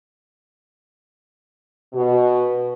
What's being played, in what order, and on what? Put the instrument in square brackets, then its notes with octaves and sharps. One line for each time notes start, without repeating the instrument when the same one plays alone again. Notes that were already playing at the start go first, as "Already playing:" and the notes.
[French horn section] B2